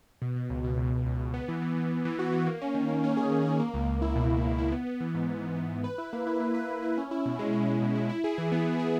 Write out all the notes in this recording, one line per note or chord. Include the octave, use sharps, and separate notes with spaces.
B2
B2
C#2
B2
C#2
C#2
C#2
C#2
B3
E3
E3
E3
E3
E3
F#4
E3
A#3
C#4
D#3
A#3
C#4
G#4
D#3
G#4
A#3
C#2
A#3
E4
B2
B2
A#3
E4
B3
B3
E3
G#2
G#2
G#2
B3
E3
B4
E4
A#3
E4
A#3
B4
B4
E4
C#4
E4
B2
G#3
C#4
G#3
B2
E4
E4
G#4
E3
B3
B3
G#4